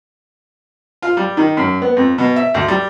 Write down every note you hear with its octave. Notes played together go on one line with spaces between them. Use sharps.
F4
G3
D#3
F#2
B3
F2
B2
E5
D2
G3